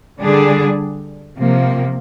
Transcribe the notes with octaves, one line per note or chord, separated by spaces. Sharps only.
D3 G3 D4 G#4
C3 F3 A#3